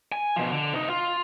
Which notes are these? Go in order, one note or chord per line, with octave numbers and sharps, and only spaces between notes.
G#5
B2 F3
D3
C3 D#4
F4